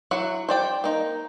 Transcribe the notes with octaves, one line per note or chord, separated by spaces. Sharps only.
F#3 E4 F#5
C5 D5 G5
A#3 D#4